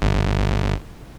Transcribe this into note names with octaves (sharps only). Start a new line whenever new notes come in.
G1